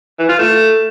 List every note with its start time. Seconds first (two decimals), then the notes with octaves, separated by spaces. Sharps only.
0.19 E3
0.29 F4
0.39 A3